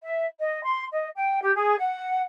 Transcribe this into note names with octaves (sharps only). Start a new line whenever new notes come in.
E5
D#5
C6
D#5
G5
G4
G#4
F#5